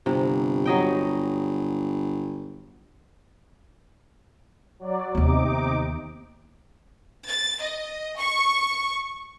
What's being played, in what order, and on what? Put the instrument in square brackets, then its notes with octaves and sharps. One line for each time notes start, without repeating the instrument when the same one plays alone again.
[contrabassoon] G1 [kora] C3
[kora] F#3 D#5 G5
[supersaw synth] F#3 D5
[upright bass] D#2 B3 [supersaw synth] C3 D#4 D6
[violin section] A6
D#5
C#6